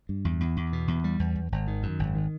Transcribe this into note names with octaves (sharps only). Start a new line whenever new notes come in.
G2
E2
E2
E2
B2
E2
G3
E2
E2
G#1
D#3
F#2
G#1
D#3